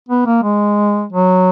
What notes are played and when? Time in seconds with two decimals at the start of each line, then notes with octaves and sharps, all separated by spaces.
0.08 B3
0.26 A#3
0.43 G#3
1.12 F#3